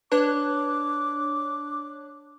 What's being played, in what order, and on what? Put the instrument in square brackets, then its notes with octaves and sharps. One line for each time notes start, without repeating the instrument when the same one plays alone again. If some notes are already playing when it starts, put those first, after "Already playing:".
[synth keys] D4 C#5 F#6 [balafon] B4 [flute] D6